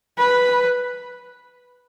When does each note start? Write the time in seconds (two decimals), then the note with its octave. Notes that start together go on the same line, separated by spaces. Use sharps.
0.18 B4